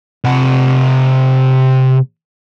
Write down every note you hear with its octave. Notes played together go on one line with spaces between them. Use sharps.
C3 F#5